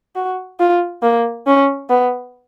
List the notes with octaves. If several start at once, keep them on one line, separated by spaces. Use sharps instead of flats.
F#4
F4
A#3
C#4
B3